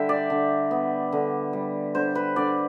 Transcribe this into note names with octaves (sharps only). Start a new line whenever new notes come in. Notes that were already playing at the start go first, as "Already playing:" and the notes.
Already playing: D3 G3 E5 G5
D5
D3
B3
D3
G3
D3 C5
B4
D3 D5